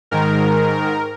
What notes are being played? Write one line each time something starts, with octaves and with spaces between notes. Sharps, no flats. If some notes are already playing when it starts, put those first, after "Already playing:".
G#2 D#3 A#4